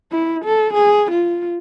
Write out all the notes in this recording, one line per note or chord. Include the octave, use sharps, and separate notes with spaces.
E4
A4
G#4
F4